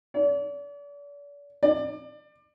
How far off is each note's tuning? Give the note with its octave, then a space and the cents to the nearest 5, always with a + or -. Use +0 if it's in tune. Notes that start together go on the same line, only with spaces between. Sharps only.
D5 -40
D5 +30